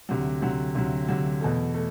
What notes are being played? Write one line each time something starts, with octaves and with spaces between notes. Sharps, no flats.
D2 C3 F#3
D2 C3 F#3
D2 C3 F#3
D2 C3 F#3
E2 B2 A3
A3